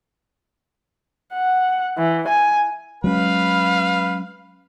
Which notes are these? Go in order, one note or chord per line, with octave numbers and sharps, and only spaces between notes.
F#5
E3
G#5
F#3 G#3 C#4 B4 F5 B5